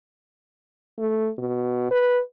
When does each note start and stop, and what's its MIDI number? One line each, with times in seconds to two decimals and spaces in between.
0.98 1.30 57
1.38 1.90 47
1.91 2.20 71